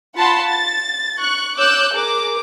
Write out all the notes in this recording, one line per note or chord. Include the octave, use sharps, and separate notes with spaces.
F4 F#5 A5 B5 C6
A6
C#6 F#6
C#5 D6 E6 F#6 G6
G#4 A#4 D6